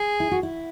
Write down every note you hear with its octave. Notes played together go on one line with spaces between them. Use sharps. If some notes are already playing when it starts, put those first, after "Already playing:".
Already playing: G#4
E4
F#4
E4